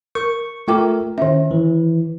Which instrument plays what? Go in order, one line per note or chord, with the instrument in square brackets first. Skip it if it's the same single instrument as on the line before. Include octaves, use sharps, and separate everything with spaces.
[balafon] A#4 [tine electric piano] C#6
[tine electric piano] A3 A#4 [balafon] F4 G5 D6
[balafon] D#3 E5 [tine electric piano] C#4
[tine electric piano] E3